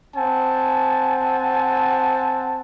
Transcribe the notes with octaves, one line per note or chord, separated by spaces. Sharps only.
C4 F#5 G#5 A5